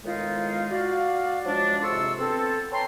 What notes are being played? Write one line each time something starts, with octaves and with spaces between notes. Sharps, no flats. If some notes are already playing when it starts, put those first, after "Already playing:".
A2 D#3 G#3 B3 D#4 F4
F#4 D5 F5
F3 F#3 G#3 D4
F2 G#2 C3 C6 C#6 E6
B3 C4 A4
B4 C#5 G5 A5 A#5 C6